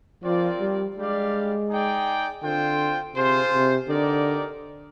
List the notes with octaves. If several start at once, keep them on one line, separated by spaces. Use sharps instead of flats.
F3 C4 F4 A#4 D5
G3
G3 G#3 D4 G4 D5 F5
D#4 G#4 D5 G5
D3 C4 F4 C5 G5
C3 F4 G#4 C5
C3
D3 D#4 G4 A#4 D5